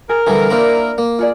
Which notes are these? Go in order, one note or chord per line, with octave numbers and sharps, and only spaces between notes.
G#4 A#4
D3 E3 G3 G#4 A4
A#3 D4 E4 C5 D5
A#3
F4 G#4 D5